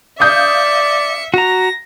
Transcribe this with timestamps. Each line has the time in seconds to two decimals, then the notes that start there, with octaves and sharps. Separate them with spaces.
0.20 D5 E5 F5 D#6 G6 C#7
1.34 F#4 A#5 A#6